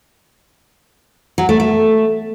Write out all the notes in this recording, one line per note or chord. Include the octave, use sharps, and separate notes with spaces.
F#3
A3
A3